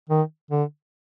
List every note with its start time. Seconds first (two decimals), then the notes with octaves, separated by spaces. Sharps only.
0.10 D#3
0.51 D3